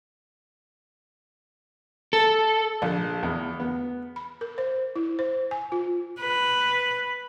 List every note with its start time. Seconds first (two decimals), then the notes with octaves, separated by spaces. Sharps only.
2.13 A4
2.82 A#1
3.23 E2
3.60 B3
4.16 B5
4.41 A#4
4.58 C5
4.96 E4
5.19 C5
5.51 G#5
5.72 F4
6.21 B4